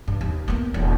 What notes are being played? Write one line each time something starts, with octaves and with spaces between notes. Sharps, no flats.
G2
D#2
A#3 B3
D#1